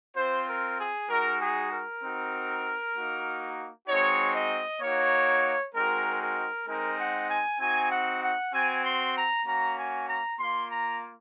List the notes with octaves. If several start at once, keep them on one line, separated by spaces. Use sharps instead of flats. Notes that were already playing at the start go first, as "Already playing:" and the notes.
C4 F4 C5
A#4
G#4
G#3 D#4 F#4 A#4
G#4
A#4
C4 D#4 F#4
A#3 D#4 F#4
G#3 C4 D#4 F#4 C#5
D#5
A#3 D#4 F#4 C#5
G#3 C4 D#4 F#4 A#4
A#4
G#3 C4 D#4 A#4
F#5
G#5
C4 D#4 F#4 G#5
F#5
F#5
C4 F#4 G#5
C6
A#5
A#3 C#4 F#4 A#5
G#5
A#5
A#3 F4 C6
A#5